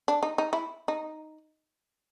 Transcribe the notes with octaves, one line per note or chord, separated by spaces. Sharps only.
D4
D#4
D#4
E4
D#4